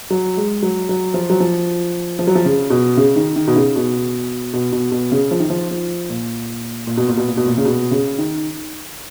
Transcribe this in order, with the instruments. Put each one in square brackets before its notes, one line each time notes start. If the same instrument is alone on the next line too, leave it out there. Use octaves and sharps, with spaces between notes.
[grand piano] F#3
G#3
F#3
F#3
F3
F#3
F3
F3
F#3
F3
C#3
B2
C#3
D#3
D#3
B2
C#3
B2
B2
B2
B2
C#3
F3
D#3
F3
F3
A#2
A#2
B2
A#2
B2
A#2
B2
A#2
C#3
B2
C#3
D#3